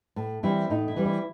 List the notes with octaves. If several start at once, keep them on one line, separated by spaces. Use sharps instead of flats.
A2
E3 G3 C4 E4
A2 D#4
E4
E3 G3 C4
E4